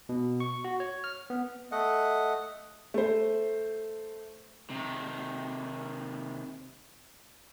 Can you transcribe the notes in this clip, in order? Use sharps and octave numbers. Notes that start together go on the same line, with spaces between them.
B2
C#6
F#4
C#5
F6
B3
A3 D#5 F#5
A3 C5
C3 D#3